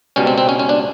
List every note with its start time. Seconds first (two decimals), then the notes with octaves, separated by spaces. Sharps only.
0.16 C#2 B2 G3 C#4
0.27 C4
0.38 C4
0.49 C#4
0.59 C#4
0.69 D4